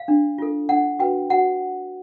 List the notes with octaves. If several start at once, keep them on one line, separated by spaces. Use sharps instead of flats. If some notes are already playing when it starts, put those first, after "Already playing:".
Already playing: F5
D4
F4 A4
D4 F#5
F#4 B4 G5
F#4 F#5